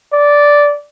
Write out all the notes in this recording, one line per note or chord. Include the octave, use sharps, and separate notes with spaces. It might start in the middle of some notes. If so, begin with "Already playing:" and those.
D5